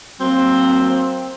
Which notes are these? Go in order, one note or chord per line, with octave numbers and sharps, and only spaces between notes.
F#3 A#3 C4